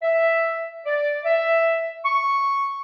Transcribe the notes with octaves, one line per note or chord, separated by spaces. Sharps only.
E5
D5
E5
C#6